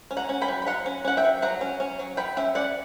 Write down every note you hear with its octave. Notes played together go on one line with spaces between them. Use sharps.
C#4
F#5 A#5
C#4
G5 B5
F#3
B5
F#3 F#5 A#5
C#4
C#4 F#5
E5 G5
F#3
F#3 F#5 A#5
C#4
C#4
F#3
F#3 G5 B5
C#4 E5 G5
C#4 D5 F#5